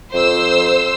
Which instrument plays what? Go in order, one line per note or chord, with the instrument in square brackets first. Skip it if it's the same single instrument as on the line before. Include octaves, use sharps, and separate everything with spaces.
[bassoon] F2 [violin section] C5 E6